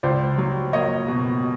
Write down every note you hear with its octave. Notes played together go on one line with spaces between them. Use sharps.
C#2 C5 D5
F#3
A#3 C#5 D#5
B2